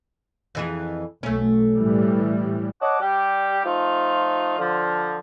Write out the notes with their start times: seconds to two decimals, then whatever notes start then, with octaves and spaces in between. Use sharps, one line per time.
0.55 F2 E3 G#4
1.23 B1 A3 C#4
1.74 A2 E3 G3
2.81 C#5 D#5 F#5 A5 D6
3.00 G3 G4
3.65 F3 A3 D#4 F4
4.58 D3 F3